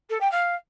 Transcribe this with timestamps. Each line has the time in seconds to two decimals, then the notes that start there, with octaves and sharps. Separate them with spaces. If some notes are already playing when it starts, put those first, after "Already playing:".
0.09 A4
0.20 G5
0.31 F5